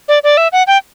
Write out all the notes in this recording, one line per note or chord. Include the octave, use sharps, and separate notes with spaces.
D5
D5
E5
F#5
G5